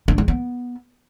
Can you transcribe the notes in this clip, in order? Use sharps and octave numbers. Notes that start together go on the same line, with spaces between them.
D4
G#3
B3